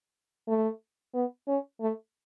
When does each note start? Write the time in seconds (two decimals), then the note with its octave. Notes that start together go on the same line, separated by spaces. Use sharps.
0.48 A3
1.14 B3
1.47 C#4
1.81 A3